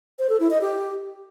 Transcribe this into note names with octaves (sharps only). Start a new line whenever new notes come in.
C5
A4
E4
D#5
G4